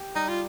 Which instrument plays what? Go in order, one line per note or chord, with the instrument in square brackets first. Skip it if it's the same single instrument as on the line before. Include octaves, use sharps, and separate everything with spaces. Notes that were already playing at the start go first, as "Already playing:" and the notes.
Already playing: [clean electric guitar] G4
[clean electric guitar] G3 [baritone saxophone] D#4
[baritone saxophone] F4